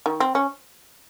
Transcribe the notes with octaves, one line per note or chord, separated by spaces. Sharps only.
D#3
C4
C#4